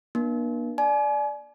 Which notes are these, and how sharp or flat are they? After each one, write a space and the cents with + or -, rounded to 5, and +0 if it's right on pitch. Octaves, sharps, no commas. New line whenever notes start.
A#3 +45 D4 +35
D5 +0 G#5 +40